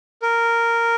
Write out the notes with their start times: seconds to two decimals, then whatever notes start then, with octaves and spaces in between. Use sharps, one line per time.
0.22 A#4